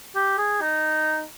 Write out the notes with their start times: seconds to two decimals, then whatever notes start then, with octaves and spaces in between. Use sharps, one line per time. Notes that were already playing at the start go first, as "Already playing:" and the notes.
0.15 G4
0.38 G#4
0.61 D#4